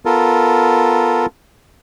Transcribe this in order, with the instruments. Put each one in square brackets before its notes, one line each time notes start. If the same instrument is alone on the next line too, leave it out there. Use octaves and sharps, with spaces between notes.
[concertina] B3 F4 A4 A#4